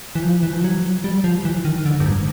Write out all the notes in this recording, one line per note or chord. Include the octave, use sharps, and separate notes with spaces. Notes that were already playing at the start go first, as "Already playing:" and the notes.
E3
F3
E3
F3
F#3
G3
F3
E3
D#3
D3
G2
G#2